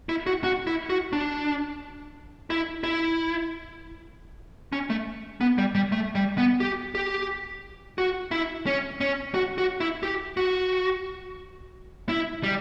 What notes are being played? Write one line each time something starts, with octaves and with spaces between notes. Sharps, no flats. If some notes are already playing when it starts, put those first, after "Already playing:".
E4
F#4
F#4
E4
F#4
D4
E4
E4
C#4
A3
B3
G3
G3
A3
G3
B3
G4
G4
F#4
E4
C#4
C#4
F#4
F#4
E4
G4
F#4
E4
G3